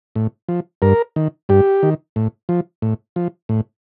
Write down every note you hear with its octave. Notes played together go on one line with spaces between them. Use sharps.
A2
F3
G2 A#4
D#3
G2 G4
D#3
A2
F3
A2
F3
A2